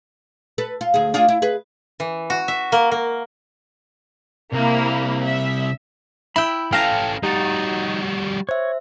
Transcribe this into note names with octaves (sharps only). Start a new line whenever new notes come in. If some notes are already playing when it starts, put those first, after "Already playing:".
A4 B4
F4
D2 G#4
D4 F4 G#4
E4
G#4 B4
E3
F#4
E5
A#3
A#3
C2 A#3 E4
E5
E4 G5 B5 E6
A3 C#4 F5 G5 A5 A#5
G3 D#4 F#4 G4 A6
C5 C#5 E5